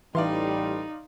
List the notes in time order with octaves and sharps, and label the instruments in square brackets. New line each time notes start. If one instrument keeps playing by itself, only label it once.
[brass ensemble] A1 G3 [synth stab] E3 [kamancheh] D#4 [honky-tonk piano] D5 F5 C6